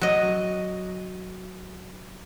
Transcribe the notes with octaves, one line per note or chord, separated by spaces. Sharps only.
F#3 D#5